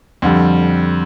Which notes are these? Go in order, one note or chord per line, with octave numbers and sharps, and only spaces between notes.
F2 D3 G3